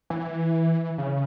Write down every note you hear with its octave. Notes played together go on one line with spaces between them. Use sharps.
E3
C#3